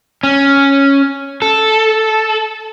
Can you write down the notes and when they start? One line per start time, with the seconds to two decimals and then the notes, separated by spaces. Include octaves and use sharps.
0.23 C#4
1.42 A4